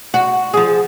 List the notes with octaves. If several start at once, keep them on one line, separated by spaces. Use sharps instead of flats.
F#4
F3 G#4